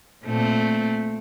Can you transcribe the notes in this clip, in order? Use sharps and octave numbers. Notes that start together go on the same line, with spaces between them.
A#2 A3 C4